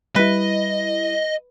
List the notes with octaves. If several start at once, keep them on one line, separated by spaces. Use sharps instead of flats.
G3 E4 B4 D#5